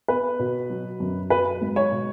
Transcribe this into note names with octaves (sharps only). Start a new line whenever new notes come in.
B3 B4
B2
F#3
F#2
F#3 B4
G#2
C#5
B2